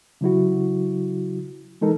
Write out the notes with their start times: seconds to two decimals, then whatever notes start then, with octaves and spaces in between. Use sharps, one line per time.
0.21 C#3 F#3 E4 F#4
1.81 E3 G#3 D#4 A4 A#4